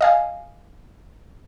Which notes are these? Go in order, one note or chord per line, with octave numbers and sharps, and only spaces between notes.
D#5 F5 G#5